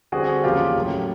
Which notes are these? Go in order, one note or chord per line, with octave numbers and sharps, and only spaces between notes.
D3 G3 C4 F#4 G#4
E2 C#3 F3 A#3 F4 G4
A2 F#3 A#3 C#4